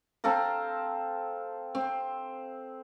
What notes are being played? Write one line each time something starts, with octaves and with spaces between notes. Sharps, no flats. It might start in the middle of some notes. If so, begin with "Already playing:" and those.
C4 A4 F5 A#5
C4